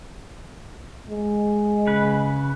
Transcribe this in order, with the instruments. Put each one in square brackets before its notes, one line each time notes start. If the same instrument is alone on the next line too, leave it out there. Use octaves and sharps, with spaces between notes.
[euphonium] G#3
[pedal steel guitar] C#3 B4